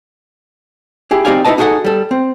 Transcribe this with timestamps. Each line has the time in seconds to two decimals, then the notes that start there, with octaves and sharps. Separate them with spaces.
1.11 E4 G4 G#4
1.25 C4 D#4 G4 D5 F5 G#5
1.45 D#4 E4 G#4 B4 D#5 A5
1.58 D#4 F#4 G#4 A4 F#5
1.84 G3 A4
2.11 C4